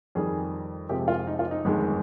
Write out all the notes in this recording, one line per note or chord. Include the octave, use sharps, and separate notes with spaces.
F2 D#3 G3 G#4
F2 C3 F3 G#3 G4
F4
D#4
F4
D#4
G1 F2 D#3 G#3